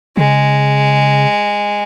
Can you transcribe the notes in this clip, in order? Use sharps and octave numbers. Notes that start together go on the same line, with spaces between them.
C#3 G#3